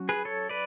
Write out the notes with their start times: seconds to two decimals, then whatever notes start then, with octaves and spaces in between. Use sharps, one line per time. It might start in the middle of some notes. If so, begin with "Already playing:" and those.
Already playing: F#3 C#4
0.09 G#4 B4
0.25 A4 C#5
0.49 B4 D5